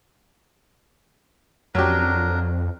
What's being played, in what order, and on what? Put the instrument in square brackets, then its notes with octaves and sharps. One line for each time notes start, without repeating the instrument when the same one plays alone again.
[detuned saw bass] F2 [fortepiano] F#3 C#4 G4 [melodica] D4 A#4